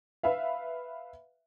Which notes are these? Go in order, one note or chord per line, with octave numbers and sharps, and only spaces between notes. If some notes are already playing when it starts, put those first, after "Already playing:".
B4 E5 F5